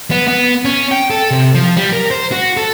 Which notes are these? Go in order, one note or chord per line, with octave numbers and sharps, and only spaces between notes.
B3
B3
C#4
G5
A4
C3
F3
G3
A#4
C5
F#4
A4